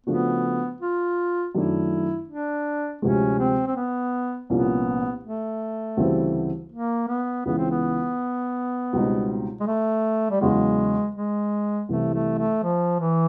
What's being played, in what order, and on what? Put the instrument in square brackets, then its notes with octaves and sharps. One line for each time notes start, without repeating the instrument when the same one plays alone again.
[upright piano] C#3 F3 A3 D4 F#4 [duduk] B3
[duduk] F4
[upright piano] F#2 D#3 F#3 A3 D4 [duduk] E4
[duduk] D4
[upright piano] D2 C3 F3 G#3 [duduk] C#4
[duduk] C4
C4
B3
[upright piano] C2 A#2 F3 A#3 C#4 [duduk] B3
[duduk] A3
[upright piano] D2 C#3 E3 G3 C4
[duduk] A#3
B3
[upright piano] C#2 C#3 E3 [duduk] B3
[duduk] C4
B3
[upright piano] C#2 B2 G3 C4 D#4
[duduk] G#3
A3
G3
[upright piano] E2 C#3 F#3 [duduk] G#3
[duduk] G#3
[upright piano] C2 C3 E3 [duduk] A3
[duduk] A3
A3
F3
E3